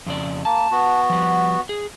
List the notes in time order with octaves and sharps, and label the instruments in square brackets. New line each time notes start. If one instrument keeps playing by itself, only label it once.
[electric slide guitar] F2 C#3 D5
[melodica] A#3 [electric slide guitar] A5
[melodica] B3 F#4
[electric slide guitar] F3 G3
G#4